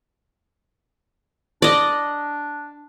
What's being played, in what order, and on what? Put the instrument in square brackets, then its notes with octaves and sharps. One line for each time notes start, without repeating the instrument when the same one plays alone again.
[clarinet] D4 [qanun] D5 D#5